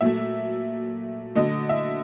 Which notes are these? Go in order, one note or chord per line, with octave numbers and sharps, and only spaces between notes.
A#2 F#3 A3 E5
D3 F#3 A3 D#5
E5